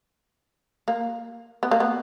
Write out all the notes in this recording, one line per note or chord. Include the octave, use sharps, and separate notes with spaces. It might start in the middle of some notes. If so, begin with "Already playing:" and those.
A#3
B3
A#3
B3